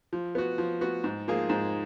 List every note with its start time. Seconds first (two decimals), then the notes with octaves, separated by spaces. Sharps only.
0.13 F3
0.35 B3 F#4
0.58 F3
0.81 B3 F#4
1.04 G#2
1.28 F3 A#3 F4 G#4
1.49 G#2